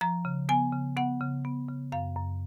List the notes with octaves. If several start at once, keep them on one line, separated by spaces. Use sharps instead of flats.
F3 A#5
C#3
B3 G#5
C#3
B3 F#5
C#3
B3
C#3
F#2 F5
F#2